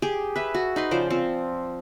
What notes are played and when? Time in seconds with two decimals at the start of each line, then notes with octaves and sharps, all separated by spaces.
0.02 G4 G#4
0.36 B4 E5
0.54 F#4
0.76 D#4 B4 C6
0.91 C#3 F3 C5 D5
1.10 F3 C4